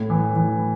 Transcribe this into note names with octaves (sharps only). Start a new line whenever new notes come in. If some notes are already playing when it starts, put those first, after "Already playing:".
Already playing: A2
E3
E3